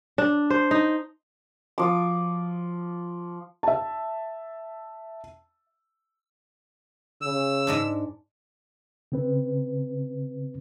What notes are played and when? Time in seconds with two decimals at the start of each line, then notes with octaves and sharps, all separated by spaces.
0.18 D4
0.50 C5
0.71 D#4
1.78 F3 D6
3.63 E5 A5
7.21 C#3 E6
7.67 G#2 G#3 D4
9.12 C#3 C4 B4